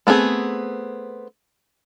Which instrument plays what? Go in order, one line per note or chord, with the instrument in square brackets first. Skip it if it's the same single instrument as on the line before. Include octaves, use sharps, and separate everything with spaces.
[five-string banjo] A3 B3 C4 G#4